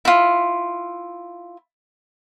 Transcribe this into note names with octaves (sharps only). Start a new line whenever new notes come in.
E4 F4